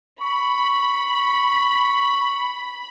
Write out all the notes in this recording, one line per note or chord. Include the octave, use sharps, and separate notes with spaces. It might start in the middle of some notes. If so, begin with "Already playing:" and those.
B5 C#6